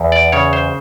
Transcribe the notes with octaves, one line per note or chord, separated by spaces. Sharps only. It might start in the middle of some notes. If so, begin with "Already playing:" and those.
Already playing: E2
D5
C#3 C#5
C5